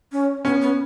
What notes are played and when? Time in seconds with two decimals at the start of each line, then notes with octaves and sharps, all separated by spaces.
0.12 C#4
0.45 B3 C#4
0.62 B3